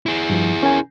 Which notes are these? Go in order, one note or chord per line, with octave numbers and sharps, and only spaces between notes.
E4 G#4
G2 F3
C#4 A#4 G#5